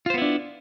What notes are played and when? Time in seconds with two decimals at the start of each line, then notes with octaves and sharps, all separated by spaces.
0.06 F4
0.10 C5
0.14 B3
0.18 E4
0.22 D4